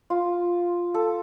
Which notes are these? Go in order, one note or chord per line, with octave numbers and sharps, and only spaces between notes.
F4
A4